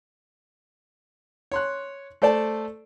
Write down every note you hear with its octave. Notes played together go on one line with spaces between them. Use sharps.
C#5 C6 F#6
A3 A4 C5 D5 A5